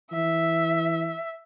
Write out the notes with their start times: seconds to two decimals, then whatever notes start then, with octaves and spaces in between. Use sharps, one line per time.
0.12 E3 E5